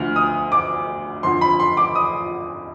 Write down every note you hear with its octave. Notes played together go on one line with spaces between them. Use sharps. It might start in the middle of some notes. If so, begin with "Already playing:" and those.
Already playing: D2 D3 F3 F6
D#6
D6
F2 D3 F3 C6
B5
C6
D6
D#6